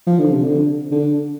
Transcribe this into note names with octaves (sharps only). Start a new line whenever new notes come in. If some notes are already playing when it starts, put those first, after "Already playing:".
F3
D3
C3
D3
D3